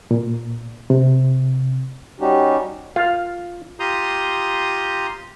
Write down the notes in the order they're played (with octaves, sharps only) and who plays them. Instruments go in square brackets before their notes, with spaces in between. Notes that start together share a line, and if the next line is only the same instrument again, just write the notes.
[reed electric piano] A#2
C3
[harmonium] G3 C#4 D#4 F#4 G4
[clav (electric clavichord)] F4 [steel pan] F5
[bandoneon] F4 G4 A#5 C6 D#6 G6